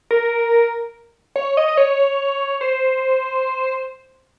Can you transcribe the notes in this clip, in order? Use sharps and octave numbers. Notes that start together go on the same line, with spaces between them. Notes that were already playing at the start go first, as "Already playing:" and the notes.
A#4
C#5
D#5
D#5
C#5
C5